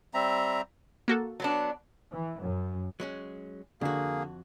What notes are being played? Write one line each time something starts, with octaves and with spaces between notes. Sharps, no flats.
G3 C4 E5 A#5
A#3 F#4 A4
F#3 B3 D4
E3
F#2
F#3 G#3 C#4
F2 D3 A#3 F#4 G#4